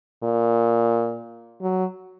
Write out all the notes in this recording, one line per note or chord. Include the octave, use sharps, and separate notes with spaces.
A#2
F#3